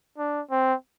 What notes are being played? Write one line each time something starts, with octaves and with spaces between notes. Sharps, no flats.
D4
C4